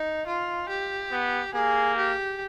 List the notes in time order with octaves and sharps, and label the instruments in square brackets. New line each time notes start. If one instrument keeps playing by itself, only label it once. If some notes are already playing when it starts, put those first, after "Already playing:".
Already playing: [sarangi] D#4
F4
G4
[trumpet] B3
[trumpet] A#3 [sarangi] G#4
[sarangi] G4